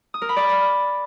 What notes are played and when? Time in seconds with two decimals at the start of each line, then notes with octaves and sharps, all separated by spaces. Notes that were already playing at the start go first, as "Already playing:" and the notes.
0.14 D#6
0.22 A#4
0.29 B5
0.36 D5